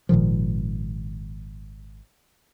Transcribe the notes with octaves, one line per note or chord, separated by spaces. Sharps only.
G#1 A#2 D#3 F3